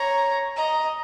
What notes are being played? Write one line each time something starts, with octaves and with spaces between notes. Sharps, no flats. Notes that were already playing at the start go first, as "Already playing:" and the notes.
Already playing: C#5 A#5
D#5 A#5